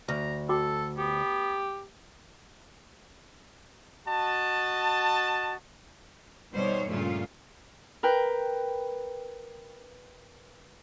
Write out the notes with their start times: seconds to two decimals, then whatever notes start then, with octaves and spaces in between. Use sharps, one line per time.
0.08 D2 A#5
0.49 F#4 A4 G5 D6
0.98 B3 G4
4.07 F#4 D#5 A5
6.53 B2 D#3 G3 C5 C#5
6.88 G2 A#2 C#3 A3 F4
8.03 A#4 B4 G5